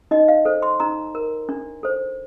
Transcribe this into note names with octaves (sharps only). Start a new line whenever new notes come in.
D#4 D#5
F5
A4 C5
C6
D#4 A#5
A#4
D4
A4 C5